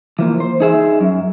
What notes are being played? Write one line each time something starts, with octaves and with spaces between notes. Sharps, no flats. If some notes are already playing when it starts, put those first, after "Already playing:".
E3 F3 A#3
C5
D#4 G#4 E5
F#2